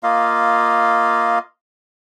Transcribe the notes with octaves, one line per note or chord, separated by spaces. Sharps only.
A#3 F4 D#5 F5